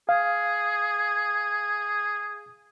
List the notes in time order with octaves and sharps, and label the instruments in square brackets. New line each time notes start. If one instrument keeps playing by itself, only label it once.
[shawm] G#4 [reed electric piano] F5